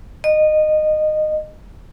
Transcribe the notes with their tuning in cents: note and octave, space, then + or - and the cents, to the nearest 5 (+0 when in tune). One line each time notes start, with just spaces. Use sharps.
D#5 -20